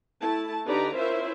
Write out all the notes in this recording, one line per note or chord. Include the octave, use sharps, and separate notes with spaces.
A3 E4 A5
D3 D#4 G4 B4 D5 A#5
C#4 E4 F4 A#4 C5 E5